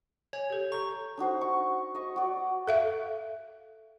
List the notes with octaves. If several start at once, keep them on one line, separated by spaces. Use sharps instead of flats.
C#5 G#5
G4 A4
A4 A#5 C#6
D4 D#4 F#4 C5
C#6
D#5 C#6
F#4 D5
A4 E5 F5